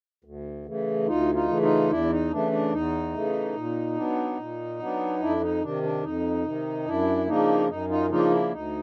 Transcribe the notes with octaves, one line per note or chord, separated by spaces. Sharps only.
D2
C#3 E3 A3
D2 D#4 F4
D#4 F4
C#3 E3 A3
D#4 F4
E2 D4 E4
D#4
C#3 E3 A3 D4
D4
E2 D#4
C#3 E3 A3
A#2
F#3 B3 D4
A#2
F#3 B3 D4
F2 D4 E4
D#4
C3 D#3 D4
D4
F2 D#4
C3 D#3
F#2 D4 E4
C#3 F3 A#3 D4 D#4
F#2 D#4
D#4 F4
C#3 F3 A#3 D4 D#4 F4
D4 E4
D2 D#4